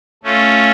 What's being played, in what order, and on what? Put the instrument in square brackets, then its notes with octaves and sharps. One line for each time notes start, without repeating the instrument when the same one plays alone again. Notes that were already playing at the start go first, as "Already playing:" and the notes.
[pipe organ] A3 C#4 F4